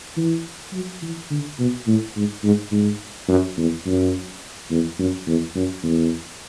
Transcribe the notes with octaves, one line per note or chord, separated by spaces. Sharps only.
E3
F#3
E3
D3
B2
A2
G#2
G#2
G#2
F#2
E2
F#2
E2
F#2
E2
F#2
E2